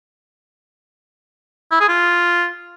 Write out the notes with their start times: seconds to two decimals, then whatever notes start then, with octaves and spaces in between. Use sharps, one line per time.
1.72 E4
1.80 G#4
1.88 F4